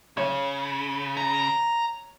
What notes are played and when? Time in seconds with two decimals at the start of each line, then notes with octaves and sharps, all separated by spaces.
0.17 C#3 C#5
1.17 A#5